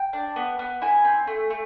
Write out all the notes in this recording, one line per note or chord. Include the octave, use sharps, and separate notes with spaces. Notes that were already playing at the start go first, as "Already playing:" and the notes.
Already playing: G5
D4
B3
B3
E4 G#5
C4
A3
A3